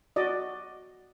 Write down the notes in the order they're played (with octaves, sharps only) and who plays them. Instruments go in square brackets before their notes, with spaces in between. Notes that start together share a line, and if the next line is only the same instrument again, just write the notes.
[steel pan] F#4 D5 D#5